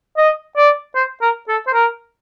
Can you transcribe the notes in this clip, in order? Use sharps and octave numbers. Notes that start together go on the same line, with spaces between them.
D#5
D5
C5
A#4
A4
C5
A#4